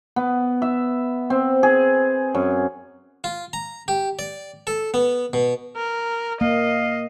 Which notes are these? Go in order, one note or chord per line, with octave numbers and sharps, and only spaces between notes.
B3
E5
C4
G#4
F#2
F4
A#5
G4
D5
A4
B3
B2
A#4
A#3 D#5 F5